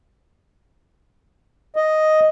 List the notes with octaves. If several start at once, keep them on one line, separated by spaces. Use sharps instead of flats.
D#5